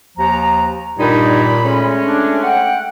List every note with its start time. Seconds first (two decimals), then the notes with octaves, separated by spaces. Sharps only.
0.18 D#2 F3 A#5
0.99 G2 A#2 D#3 D#4 B5
1.64 G#3 A3 C#4
2.05 D4
2.43 F#5 G5